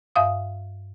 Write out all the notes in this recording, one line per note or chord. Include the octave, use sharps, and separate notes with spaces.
G2 E5 F5 D#6